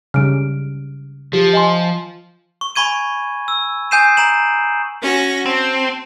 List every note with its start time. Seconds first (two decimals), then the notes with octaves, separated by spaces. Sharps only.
0.14 C#3 G3 F6 D7
1.33 F3 G4
1.53 D#5 G#5 C6
2.61 C#6
2.76 G#5 B5 C#6 G#6 D#7
3.48 E6
3.91 G#5 D#6 G6 C7 D#7 E7
4.17 A#5 D7 E7 F#7
5.03 C#4 F#4 A#6
5.46 C4 A5